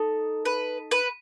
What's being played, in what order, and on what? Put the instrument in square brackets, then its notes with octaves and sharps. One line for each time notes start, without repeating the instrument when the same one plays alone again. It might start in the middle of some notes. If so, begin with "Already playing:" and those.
Already playing: [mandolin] D#4 A4
B4
B4